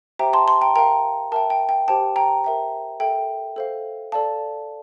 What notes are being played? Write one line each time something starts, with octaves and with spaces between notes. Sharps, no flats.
G4 C5 E5 G5 A#5
A5 C6
A5 C6
G5 A#5
A#4 F5 G5 A#5
A#4 E5 G5 A5
G5
G5
G4 C5 G5 A5
G5 A#5
A#4 E5 G5
A4 E5 G5
A4 C5 F5
A4 D5 F5 A5